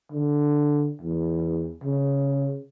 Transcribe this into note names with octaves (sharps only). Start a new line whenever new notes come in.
D3
E2
C#3